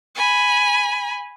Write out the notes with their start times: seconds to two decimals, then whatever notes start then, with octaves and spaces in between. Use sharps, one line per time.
0.15 G#5 B5